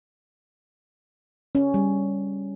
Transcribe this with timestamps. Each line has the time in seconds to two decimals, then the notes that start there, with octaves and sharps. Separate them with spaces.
1.55 C#4
1.74 G3